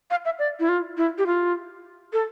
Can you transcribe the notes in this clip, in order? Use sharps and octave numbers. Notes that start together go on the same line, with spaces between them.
F5
E5
D5
E4
F4
E4
G4
F4
A4